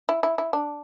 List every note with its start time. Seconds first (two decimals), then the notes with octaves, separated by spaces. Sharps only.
0.09 E4
0.23 E4
0.38 E4
0.53 D4